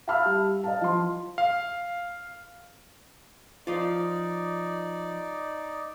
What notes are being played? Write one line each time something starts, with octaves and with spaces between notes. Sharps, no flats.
E5 F5 A5 B5 E6 F6
G3
D#5 F5 A5
F3 C6
F5
F3 D#4 F4 D5